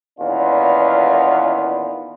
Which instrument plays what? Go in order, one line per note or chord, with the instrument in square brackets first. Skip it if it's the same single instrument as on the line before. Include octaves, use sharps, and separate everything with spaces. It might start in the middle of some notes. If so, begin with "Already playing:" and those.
[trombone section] E2 A#2 D#3 B3 C#4 F4